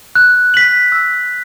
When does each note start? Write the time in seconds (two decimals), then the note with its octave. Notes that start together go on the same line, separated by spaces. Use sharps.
0.15 F#6
0.54 B6 F#7
0.92 E6